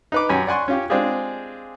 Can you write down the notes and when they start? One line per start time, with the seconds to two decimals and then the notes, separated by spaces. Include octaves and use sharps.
0.12 D#4 B4 D6
0.29 F#2 G4 C#5 G#5
0.47 D5 F#5 G#5 C6 C#6
0.68 C#4 F4 G4
0.90 G#3 C4 D4 F4 G4 G#4